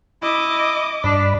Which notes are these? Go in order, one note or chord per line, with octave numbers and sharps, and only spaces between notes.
E4 D#5 D6
G2 D4 D5 B5